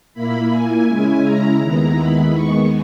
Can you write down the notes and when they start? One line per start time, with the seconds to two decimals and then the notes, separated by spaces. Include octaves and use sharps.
0.14 A#2 A#3 E4 B5
0.51 G#5
0.87 C#3 G#3 C#4 E4
1.23 A#5
1.60 D#2 D#3 G#3 B3 E4
1.96 B5
2.32 D#2 D#3 G#3 B3 C#6